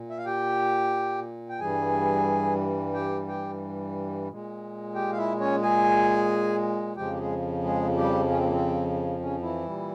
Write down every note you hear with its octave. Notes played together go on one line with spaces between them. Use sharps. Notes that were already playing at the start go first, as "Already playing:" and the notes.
Already playing: A#2
E5
F5
G4 G5
G5
G2 E3 G3 G#4 G#5
G4 G5
G4 G5
A#2 G#3
G4 G5
F5
E4 E5
C#4 C#5
G#4 G#5
F2 C#3 F3 G#3 G4 G5
G4
G#3 G#4
G#3 G#4
G3 G4
C#4
C4
A#3
C4
C#3 C#4
E3 E4
A#2 G3